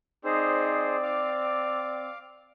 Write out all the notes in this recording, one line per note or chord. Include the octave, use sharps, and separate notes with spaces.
C4 D#4 G#4 C5 D5
F5 D6